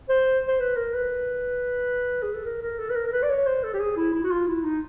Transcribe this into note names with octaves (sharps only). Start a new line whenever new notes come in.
C5
C5
B4
A#4
B4
G#4
A4
A#4
A#4
A4
B4
A#4
A#4
B4
D5
C#5
C5
A4
G4
G#4
E4
E4
F#4
F4
E4
D#4